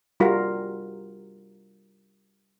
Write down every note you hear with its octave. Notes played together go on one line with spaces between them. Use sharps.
G3 F4 F#4 A#4